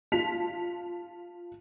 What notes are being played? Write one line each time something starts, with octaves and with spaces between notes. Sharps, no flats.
F4 A5 B6 F7